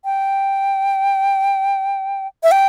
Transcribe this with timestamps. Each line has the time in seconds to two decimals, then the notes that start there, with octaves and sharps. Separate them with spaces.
0.05 G5
2.43 E5
2.51 G5